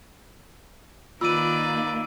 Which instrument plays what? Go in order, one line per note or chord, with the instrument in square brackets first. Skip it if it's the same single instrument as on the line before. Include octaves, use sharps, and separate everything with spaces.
[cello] D#3 A#3 [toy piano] F4 [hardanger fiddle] B4 D5 [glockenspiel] E6 D#7